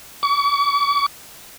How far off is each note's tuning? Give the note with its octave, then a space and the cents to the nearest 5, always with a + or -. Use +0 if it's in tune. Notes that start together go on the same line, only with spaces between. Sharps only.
C#6 +45